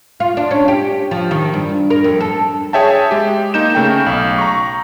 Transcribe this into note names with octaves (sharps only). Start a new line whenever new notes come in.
F4
D4
C#4
G4
F3
D#3
G2
A#4
F2
A4
G#4 C#5 E5 G5 A5
G#3 G4
A#3 D#4 G6 E7
C#3 A3 G5
B1
A#5 C#6